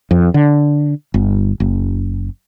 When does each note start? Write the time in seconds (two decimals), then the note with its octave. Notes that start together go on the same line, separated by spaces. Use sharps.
0.11 F2
0.34 D3
1.14 G1
1.60 F#1